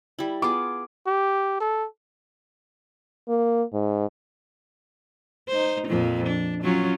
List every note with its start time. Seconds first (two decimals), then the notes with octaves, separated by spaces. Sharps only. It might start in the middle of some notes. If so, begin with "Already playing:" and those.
0.19 G3 E4
0.42 B3 F4 G#4 D6
1.07 G4
1.60 A4
3.28 A#3
3.73 G#2
5.49 D#4 C5
5.87 F2 A#2 F3
6.27 D4
6.63 F#3 C#4 F4